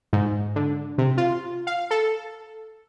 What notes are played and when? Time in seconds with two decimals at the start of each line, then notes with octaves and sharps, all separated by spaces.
0.13 G#2
0.56 D3
0.98 C3
1.17 F4
1.67 F5
1.91 A4